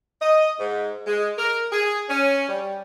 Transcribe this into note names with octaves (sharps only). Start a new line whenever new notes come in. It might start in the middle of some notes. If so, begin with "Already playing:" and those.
D#5
G#2
G#3
A#4
G#4
C#4
G3